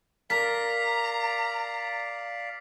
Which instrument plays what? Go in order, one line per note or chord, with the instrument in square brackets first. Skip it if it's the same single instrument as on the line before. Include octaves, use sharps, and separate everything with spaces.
[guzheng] A#4 [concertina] D5 F5 [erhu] A#5 [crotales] B6